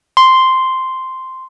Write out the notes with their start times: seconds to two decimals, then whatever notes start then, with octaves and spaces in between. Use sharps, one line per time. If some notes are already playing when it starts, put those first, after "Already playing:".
0.17 C6